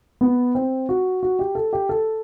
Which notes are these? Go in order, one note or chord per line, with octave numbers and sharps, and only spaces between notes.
B3
C4
F#4
F#4
G4
A4
G4
A4